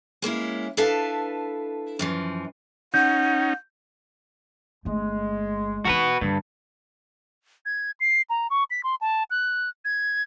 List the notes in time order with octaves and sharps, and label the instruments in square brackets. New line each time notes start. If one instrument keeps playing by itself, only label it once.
[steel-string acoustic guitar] G#3 A#3 C#4 E4
D4 E4 A4 B4 F5 A5
F#2 E3 F3
[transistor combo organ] C#4 D#4 [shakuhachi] F#5 [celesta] G6
[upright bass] G1 A3 [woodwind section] G#3
[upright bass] E3 D#4 [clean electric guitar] F#4 A#4 B4
[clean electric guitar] G2 [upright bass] D3
[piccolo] G#6
C7
A#5
C#6
B6
C6
A5
F#6
G#6